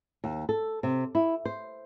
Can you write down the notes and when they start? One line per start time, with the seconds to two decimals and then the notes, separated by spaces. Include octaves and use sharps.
0.24 D#2
0.49 A4
0.83 C3
1.15 E4
1.45 C5